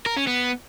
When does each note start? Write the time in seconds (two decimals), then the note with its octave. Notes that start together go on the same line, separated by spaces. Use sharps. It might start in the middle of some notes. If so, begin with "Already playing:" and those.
0.06 A#4
0.16 C#4
0.27 B3